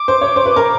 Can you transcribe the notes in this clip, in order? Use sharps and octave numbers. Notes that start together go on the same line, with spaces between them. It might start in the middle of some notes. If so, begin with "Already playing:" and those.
Already playing: D6
C5
C#5
C5
B4
A#4